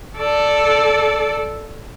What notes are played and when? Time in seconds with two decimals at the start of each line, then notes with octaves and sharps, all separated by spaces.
0.18 A4 D5